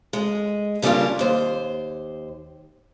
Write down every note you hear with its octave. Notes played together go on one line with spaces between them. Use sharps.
G#3
C#3 G3 A#3 D4 F4
D#2 C5